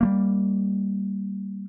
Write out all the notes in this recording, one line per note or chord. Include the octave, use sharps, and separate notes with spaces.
G3 A3 A#3